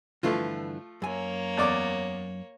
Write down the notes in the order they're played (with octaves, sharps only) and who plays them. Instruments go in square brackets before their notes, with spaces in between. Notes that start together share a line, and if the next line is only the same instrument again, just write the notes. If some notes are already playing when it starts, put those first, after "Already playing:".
[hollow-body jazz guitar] G2 D3 E3 [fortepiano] F3 A3 F4
[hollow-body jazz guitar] F#2 G#5 [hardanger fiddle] A#3 C#5
[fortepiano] E2 D5 D6